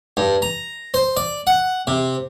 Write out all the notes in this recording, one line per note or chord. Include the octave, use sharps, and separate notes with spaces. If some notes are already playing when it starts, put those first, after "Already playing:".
G2
A#5
C5
D5
F#5
C3